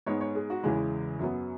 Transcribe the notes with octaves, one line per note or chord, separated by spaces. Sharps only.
G#2 G#3 B3 C#5
C#5
G#4
F#4
E2 C#3 E3 G#3 G#4
F#2 F#3 B3